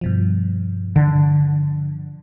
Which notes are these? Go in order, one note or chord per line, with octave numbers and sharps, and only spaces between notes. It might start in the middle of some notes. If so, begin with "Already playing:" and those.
G2 B2 F3
D3